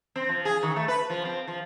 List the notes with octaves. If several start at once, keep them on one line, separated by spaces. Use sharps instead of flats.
C4
F3
G#4
D#3
A3
B4
F3
C4
F3